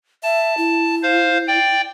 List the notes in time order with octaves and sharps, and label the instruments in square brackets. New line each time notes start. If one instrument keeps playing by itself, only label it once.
[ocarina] E5 [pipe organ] A5
[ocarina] E4
[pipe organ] C5 F5
D5 G5